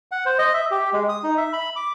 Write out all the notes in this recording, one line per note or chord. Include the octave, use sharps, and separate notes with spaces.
F#5
C5
D#5
E5
G4
G#3
D#6
D#4
E5
B5
D6